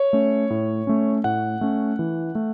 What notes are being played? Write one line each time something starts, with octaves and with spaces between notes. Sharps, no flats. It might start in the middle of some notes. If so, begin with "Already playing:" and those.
Already playing: C#5
A3 C#4
A2
A3 C#4
A2 F#5
A3 C#4
E3
A3